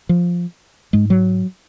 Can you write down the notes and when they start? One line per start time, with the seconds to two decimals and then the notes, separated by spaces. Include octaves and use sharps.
0.09 F3
0.93 G#2 G#3
1.10 F#3